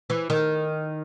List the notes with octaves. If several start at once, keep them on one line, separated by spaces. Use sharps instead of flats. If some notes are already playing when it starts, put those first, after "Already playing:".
E3
D#3